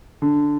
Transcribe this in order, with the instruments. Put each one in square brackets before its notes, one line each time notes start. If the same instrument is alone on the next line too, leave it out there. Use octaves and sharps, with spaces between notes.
[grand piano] D3